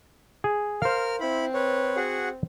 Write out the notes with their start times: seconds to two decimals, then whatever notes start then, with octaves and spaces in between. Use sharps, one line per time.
0.44 G#4
0.82 A#4 C5 F5 F6
1.20 C4 E4 B5
1.54 B4 C#5
1.96 F#4 G#4 F#5